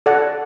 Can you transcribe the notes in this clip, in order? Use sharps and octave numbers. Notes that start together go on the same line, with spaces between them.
A4 D5 F#5